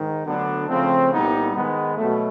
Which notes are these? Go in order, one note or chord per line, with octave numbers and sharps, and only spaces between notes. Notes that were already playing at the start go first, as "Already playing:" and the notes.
Already playing: G#2 D#3
D2 D3 F#3 B3 D4
C#3 F3 A3 C4
C2 A#2 G3 B3 D#4
G#2 D#3 G#3 B3
B2 F#3 A3